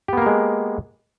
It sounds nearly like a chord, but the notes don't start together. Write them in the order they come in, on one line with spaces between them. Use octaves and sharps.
G4 B3 A#3 A#4 G#3